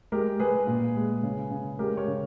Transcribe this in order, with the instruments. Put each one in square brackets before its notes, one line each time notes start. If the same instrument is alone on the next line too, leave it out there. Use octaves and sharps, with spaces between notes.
[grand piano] G#3 G4 A#4
G#3 G#4 B4
A#2
G#3
C#3
C#3
G#3 G4 A#4
A#4 C#5
C#3